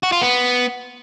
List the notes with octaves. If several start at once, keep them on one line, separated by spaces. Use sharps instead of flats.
F#4
F4
B3